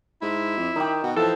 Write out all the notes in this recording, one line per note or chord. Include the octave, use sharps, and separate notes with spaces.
G#2 E4
F2
D#3 D#4 G4
B2 F#4
E3 F3 A4